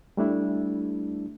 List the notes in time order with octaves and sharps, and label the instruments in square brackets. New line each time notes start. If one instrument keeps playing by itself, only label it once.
[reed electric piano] G3 A3 D4 E4